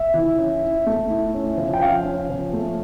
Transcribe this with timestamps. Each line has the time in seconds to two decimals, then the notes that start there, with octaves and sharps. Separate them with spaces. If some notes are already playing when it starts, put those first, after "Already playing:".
Already playing: E5
0.14 E3
0.38 C#4
0.62 E4
0.86 A3
1.10 E4
1.34 C#4
1.57 F3
1.73 G5
1.82 C#4 F5
2.05 C#4
2.29 F3
2.53 A3